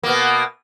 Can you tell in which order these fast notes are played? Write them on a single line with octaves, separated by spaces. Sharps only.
A#3 B2 B3